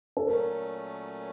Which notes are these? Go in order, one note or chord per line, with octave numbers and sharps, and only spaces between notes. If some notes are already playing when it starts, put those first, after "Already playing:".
A4
A#2 F#3 A3 C#4 A#4